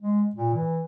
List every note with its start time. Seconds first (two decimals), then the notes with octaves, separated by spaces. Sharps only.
0.01 G#3
0.35 A#2
0.54 E3